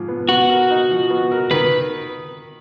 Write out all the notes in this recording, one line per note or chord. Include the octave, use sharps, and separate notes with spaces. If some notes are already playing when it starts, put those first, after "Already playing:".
Already playing: G#2 F3
B3
B3 F#4
A#4
D#4
F3
B3
A#4
D#3 B4